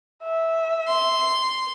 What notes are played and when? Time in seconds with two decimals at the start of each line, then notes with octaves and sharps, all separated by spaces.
0.24 E5
0.88 C6